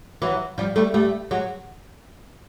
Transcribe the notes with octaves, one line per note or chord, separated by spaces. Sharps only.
E3 F#3
F3 G3
G3 A3
G3 A3
F#3 G#3